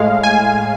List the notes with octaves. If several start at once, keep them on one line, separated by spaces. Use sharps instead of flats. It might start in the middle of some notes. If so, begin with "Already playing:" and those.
Already playing: A2 G#3 F5
G#5